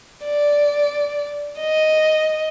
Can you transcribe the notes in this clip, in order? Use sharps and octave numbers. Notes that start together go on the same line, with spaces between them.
D5
D#5